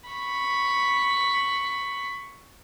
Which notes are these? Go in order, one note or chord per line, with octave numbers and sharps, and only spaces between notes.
B5 C#6